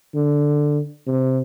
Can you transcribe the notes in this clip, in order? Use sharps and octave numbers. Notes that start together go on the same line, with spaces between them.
D3
C3